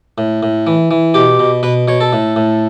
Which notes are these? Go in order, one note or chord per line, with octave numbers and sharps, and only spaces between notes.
A2
A2
E3
E3
B2 G4
B2
B2 B4
B2 C#5
A4
A2
A2